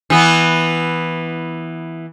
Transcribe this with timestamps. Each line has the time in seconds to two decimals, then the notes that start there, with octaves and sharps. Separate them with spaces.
0.10 E3 B3